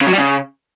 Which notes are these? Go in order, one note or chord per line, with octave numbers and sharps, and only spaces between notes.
C#3
F#3
G3
C#3